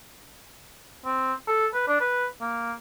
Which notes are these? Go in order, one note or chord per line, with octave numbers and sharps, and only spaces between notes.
C4
A4
B4
D4
B4
A#3